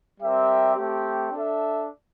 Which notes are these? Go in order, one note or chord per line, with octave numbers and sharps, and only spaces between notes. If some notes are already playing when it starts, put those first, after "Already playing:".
G3 C4 G4 A#4 E5
A3 C4 G4
D4 A4 E5